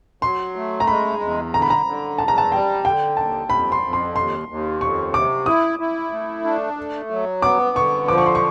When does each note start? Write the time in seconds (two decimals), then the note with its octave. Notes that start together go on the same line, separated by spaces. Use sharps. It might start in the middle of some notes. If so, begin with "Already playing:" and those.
0.22 F#3 C6
0.56 A3
0.80 A#5
0.87 G#3 B5
1.21 E2
1.54 D3 A#5
1.62 B5
1.70 A#5
1.86 D3
2.18 E2 A5
2.28 A#5
2.38 A5
2.52 G3 G5
2.84 D3 G5
3.17 D#2 A5
3.50 F2 B5
3.72 C6
3.83 F2
3.93 C6
4.15 D#2 C6
4.49 D#2
4.81 F2 C#6
5.13 C3 D6
5.46 E4 D#6
5.79 E4
6.12 A3
6.44 D4
6.77 A3
7.10 F#3
7.42 B3 D6
7.76 D3 C#6
8.08 F3 D6
8.18 C#6
8.26 C6
8.35 C#6